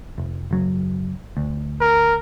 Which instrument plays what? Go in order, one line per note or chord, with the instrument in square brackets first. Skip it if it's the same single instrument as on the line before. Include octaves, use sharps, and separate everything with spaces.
[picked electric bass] F1
F#1 F#3
D2
[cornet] A#4